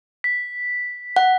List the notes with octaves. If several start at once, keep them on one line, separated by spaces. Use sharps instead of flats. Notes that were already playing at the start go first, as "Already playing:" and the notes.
B6
F#5